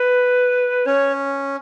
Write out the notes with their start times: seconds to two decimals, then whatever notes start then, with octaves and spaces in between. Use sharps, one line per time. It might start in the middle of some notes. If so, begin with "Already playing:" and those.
Already playing: B4
0.86 C#4 C#5